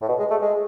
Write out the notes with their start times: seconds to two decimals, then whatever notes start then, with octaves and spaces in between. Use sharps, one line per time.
0.02 A2
0.08 B2
0.19 G#3
0.31 A3
0.42 G#3